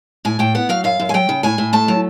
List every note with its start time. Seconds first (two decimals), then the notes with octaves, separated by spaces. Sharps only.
0.25 A2 G#5
0.39 A2 G5
0.55 B3 F#5
0.69 F#3 F5
0.84 F#2 F5
1.00 F#2
1.09 G#5
1.14 F#3 G5
1.29 C#3
1.43 A2 G#5
1.58 A2
1.73 A3 A5
1.88 F#3